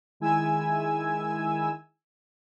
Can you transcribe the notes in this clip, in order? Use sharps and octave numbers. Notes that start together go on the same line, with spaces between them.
D#3 G#3 E4 G#5 E6 G#6